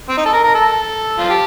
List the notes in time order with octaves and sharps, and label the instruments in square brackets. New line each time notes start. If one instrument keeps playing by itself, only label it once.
[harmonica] C4
D#4
A4
A#4
A#4
A4
F4
G4